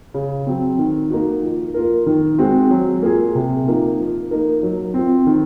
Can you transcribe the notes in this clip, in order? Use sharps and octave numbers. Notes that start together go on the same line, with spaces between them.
C#3
F#3 C4
D#3
A#3 D#4 F#4
F3
A#3 F4 A#4
D#3
G#3 C4 F#4
F#3
A#3 F4 G#4
C3
F3 A#3 D#4
F3
A#3 D#4 A#4
F#3
C4 F4
D#3